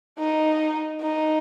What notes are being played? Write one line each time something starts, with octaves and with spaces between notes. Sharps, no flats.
D#4
D#4